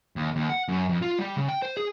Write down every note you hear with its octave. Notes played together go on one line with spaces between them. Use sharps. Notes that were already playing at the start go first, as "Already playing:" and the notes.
D#2
D#2
F#5
F#2
F2
F4
G3
C#3
G5
C5
G#4